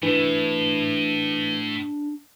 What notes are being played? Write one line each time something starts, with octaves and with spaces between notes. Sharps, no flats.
A2 E3 D4